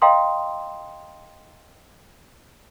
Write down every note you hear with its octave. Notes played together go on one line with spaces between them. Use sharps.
D#5 F5 G5 A#5 C6 D#6